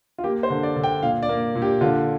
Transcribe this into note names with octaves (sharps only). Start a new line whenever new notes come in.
F4
A#3 G4
C5
D3
D5
D3
G5
A#2 F5
D5
A#3
A#2
G4
D3 F4